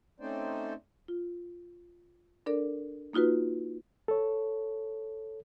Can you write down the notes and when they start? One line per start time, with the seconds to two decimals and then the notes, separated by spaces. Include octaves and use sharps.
0.20 A3 C4 C#4 D#4 C5 D5
1.08 F4
2.46 D4 A4 A#4 D5
3.13 A#3 D#4 F4 F#4 B4
4.08 A4 C#5